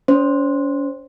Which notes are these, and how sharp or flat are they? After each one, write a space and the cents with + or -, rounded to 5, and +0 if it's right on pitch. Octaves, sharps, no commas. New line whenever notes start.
C#4 +40 C5 +0